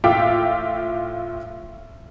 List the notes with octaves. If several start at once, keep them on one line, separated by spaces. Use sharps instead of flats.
A2 F4 E5 G5 D6